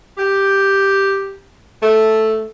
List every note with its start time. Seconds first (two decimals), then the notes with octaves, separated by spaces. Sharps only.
0.18 G4
1.82 A3